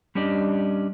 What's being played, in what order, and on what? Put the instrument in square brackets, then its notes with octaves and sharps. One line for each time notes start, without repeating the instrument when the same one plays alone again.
[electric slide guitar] G3 C#4 D4 G4 D5 D#5